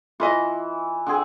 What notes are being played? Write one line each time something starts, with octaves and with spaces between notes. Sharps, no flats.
E3 F4 B4 D#5
D3 C4 G#4